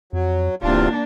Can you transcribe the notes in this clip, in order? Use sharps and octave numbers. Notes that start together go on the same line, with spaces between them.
F2 F#3
D1 E2 C3 A#3 D4 F4